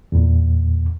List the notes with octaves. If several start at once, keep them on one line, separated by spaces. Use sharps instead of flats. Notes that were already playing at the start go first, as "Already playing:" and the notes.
E2 A#2